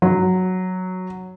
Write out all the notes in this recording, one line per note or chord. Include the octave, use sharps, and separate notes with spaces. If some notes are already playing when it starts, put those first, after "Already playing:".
F#3